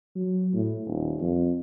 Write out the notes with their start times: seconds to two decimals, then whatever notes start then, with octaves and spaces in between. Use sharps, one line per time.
0.15 F#3
0.54 A2
0.86 D#1
1.21 F2